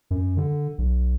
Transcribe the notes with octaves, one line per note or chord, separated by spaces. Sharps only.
F#2
D3
B1